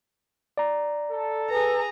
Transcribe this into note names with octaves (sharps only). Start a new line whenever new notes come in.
D5 A#5
A4
G#4 B4 A#5